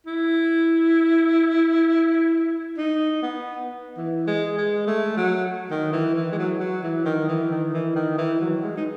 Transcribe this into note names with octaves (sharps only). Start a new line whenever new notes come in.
E4
D#4
B3
E3
G#3
G#3
A3
F#3
D#3
E3
E3
G#3
F#3
F#3
E3
D#3
E3
D#3
E3
D#3
E3
F#3
G#3
D#4